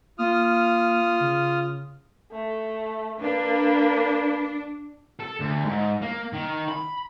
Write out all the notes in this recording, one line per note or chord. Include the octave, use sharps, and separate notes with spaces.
A#3 F4 D#6 F6
C#3
A3
A#3 D4 B4
A4
D2
G#2
A#3
D#3
B5